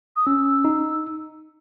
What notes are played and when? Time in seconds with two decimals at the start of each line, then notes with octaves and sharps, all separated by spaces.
0.16 D#6
0.26 C#4 E6
0.65 D#4